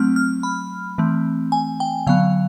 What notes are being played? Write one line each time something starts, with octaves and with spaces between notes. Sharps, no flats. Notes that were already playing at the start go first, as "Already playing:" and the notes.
Already playing: F#3 A3 C4 F6
F6
B5
E3 A3 C4
G#5
G5
D3 F#3 B3 F5